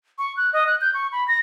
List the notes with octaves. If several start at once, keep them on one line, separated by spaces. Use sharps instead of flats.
C#6
F#6
D#5
F#6
G6
C#6
B5
A#6